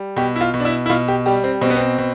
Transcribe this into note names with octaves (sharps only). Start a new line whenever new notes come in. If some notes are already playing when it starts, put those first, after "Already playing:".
Already playing: G3
B2 G4
E4
F4
B2
D4
E4
E4
B2 F4
G4
G3 G4
C4
B2 C4
B3
C4
B2